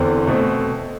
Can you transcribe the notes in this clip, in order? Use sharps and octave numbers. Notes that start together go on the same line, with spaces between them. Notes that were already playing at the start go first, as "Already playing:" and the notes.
Already playing: E2 D3 C4
B2 A3 C4